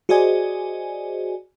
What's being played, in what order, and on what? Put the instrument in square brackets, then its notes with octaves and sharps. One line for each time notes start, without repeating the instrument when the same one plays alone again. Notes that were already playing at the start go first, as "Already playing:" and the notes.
[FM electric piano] F#4 G#4 C5 D5 D#5 G#5